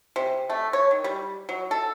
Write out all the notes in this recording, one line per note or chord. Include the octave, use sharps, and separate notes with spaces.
C3
A3
C#5
D#3
G3
F#3
A4